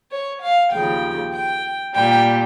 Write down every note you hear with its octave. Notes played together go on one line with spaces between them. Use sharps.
C#5
F5
D#2 C#3 F3 G5
G5
A#2 G3 G5